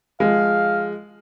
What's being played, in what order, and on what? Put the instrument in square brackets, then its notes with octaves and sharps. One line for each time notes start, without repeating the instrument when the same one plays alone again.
[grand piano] F3 G#3 [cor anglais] F5